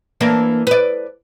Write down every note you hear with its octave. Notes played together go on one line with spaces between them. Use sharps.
E3 A#3 D4
B4 D5